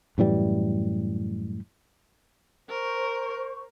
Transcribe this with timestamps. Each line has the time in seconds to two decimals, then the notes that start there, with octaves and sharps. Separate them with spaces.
0.18 F#2 A2 E3 G3
2.70 A#4 C5 C#6